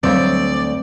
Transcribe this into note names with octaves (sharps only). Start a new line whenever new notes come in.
D2 F#3 G3 C4 C#5 D5